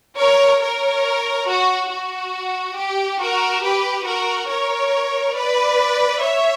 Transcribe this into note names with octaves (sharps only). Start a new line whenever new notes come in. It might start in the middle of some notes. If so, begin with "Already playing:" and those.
A#4 C#5
A#4 C#5
F#4
F#4
G4
F#4 A#4
G4 B4
F#4 A#4
A#4 C#5
B4 D5
C#5 E5